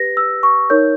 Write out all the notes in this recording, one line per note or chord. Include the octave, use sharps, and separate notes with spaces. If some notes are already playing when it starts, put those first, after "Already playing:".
Already playing: G4 B4 A#6
E6
C#6
D#4 A#4 C#5 G6